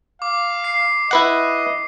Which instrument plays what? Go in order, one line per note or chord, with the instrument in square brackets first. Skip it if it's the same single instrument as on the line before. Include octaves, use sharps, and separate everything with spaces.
[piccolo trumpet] F5 [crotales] D6
[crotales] C7
[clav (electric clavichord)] E4 B4 F#5 [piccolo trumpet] D#5